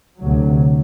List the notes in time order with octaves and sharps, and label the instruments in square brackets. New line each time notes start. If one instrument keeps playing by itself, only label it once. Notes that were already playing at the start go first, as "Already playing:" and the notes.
[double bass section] D2 C3 F#3